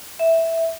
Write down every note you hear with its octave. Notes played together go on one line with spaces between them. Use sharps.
E5